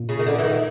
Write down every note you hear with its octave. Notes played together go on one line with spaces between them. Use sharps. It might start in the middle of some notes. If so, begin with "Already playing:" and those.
Already playing: A#2
C#3
D#3
D3
E3
D#3